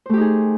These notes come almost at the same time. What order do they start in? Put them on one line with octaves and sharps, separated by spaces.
C5 A3 G4 D#4 G#4